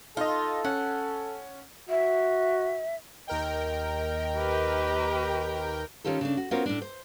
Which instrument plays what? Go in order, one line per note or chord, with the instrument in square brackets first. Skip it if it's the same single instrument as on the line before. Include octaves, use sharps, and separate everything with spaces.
[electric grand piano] D#4 D#5 [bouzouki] F4 [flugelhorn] A4
[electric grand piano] C#4 [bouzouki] F#5
[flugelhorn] F#4 [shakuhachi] E5
[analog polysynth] D#2 A#4 G5 [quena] D#5
[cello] G4 B4
[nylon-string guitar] D#3 C#4 F4 G4 A4
C#3 D4
F#4
B3 C#4 F4 F#4 A#4 C5
A2 D4
C5